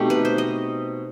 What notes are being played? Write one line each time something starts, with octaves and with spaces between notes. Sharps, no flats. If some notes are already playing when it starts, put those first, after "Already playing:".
Already playing: B2 A3 C4 D#4 G4
B4
C5
D#5